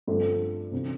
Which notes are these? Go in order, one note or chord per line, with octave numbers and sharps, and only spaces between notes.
G2 D3 F3 A3 C4
D2 C3 E3